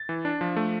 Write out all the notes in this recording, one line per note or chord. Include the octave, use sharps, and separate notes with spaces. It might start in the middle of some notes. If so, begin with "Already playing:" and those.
Already playing: A6
E3
D4
F3
A3